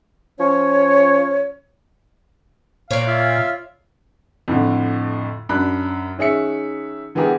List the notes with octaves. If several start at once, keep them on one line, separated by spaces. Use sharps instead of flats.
F3 C#4 C#5
A#2 C#5 D5 F5
F4 E5
F2 A2 D3
F#2 D4 B5 F#6
D#3 C#4 G#4 E5 C#7
D3 E3 B3 G4 G#4 A#4